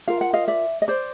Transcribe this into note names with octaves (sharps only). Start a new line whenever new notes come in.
F4 A#4 F5
F#5
D#5 F5
D5 E5
D#5
C5 D5